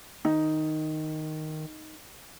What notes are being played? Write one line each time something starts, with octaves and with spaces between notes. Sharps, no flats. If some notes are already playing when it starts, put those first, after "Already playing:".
D#3 D#4